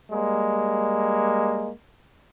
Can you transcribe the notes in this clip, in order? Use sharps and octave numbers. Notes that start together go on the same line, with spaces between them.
G3 G#3 A#3